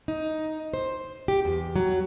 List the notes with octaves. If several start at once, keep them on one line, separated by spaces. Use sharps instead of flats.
D#4
C5
G4
E2
F#3